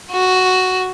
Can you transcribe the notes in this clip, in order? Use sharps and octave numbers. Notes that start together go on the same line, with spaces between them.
F#4